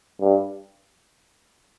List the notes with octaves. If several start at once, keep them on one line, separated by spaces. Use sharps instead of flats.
G2